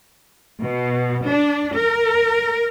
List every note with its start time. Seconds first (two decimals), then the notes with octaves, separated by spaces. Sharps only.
0.63 B2
1.28 D4
1.77 A#4